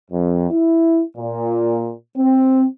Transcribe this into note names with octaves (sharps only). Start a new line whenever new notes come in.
F2
E4
A#2
C4